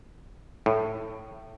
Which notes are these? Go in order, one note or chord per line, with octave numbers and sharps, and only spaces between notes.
A2